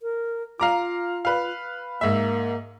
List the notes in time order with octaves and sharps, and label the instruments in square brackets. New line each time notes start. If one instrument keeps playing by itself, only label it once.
[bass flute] A#4
[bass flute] F4 [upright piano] F5 A#5 D6
[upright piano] B4 F5
[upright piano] G#2 E5 [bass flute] A#3